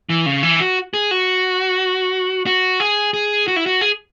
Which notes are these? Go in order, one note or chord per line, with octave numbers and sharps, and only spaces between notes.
E3
C#3
E3
F#4
G#4
F#4
F#4
G#4
G#4
F#4
E4
F#4
G#4